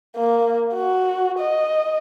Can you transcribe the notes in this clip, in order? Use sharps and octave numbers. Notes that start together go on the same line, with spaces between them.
A#3
F#4
D#5